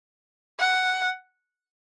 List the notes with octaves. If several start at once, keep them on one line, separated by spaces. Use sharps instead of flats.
F#5